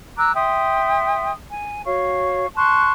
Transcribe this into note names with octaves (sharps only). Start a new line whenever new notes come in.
A#5 D6 E6 F#6
E5 G5 C6 D#6
G#5
F#4 C#5 F5 C#6
A5 C6 C#6 F#6